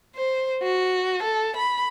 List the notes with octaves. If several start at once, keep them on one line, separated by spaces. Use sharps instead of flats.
C5
F#4
A4
B5